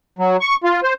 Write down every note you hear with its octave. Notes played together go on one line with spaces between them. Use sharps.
F#3
C#6
F4
C5